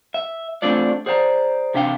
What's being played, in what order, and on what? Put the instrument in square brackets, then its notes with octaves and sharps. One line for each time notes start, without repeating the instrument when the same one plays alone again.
[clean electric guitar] E5
A3 C4 D4 F4 D5
G#4 C5 D5 F5 A#5
C3 D4 E5 F5 G5